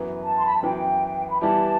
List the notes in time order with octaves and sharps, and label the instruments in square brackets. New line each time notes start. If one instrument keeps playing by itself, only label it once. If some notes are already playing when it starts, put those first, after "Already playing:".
Already playing: [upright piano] F#2 E3 B3
[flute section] A5
C6
B5
A5
[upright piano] F#2 E3 B3 [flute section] G5
[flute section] B5
[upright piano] E3 G3 B3 E4 G4 [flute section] A5